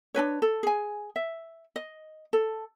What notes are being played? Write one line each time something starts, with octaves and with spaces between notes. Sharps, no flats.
D4 D#4 B4 C#5
A4
G#4 G#5
E5
D#5
A4